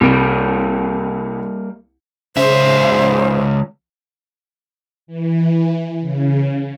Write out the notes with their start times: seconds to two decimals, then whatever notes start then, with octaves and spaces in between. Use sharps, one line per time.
0.01 C2 G3 A#3
2.37 C#2 C#3 C5 E5
5.07 E3
6.01 C#3